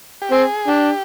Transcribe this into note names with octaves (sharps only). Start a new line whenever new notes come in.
G4
C4 G#4
D4 G4